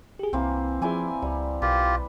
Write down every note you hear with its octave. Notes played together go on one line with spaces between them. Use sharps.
G4 G#4
C2 E3 A#3 C4
F3 E4 G#4 D5 G#5
C#2 G3
B1 F4 G4 B4